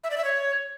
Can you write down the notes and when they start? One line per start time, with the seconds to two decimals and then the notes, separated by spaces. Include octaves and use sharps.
0.04 E5
0.11 D5
0.18 E5
0.24 C#5